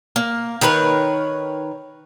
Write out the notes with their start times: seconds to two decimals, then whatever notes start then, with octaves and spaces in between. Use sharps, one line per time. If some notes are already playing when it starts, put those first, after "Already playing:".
0.16 A#3
0.61 D#3 A#4 B4 C#5